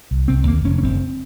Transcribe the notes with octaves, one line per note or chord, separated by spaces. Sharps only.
C2
C2 C4
D#2 A#3
F1 C#4
C#4
F#1 C4